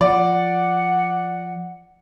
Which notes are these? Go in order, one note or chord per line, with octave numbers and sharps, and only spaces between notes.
F3 D5 F#5